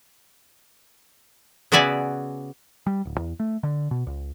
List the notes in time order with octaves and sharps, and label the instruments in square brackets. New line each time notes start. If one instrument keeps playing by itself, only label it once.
[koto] C#3 B3 F#4 D5 E5 G#5
[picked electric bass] G3
D1
E2
A3
D3
B2
C#2